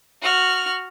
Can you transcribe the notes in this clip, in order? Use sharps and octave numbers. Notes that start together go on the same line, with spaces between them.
F#4 F6